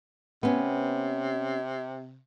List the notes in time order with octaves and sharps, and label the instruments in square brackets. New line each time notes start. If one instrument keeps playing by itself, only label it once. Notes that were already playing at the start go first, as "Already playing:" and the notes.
[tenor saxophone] C3 [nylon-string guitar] B3 C#4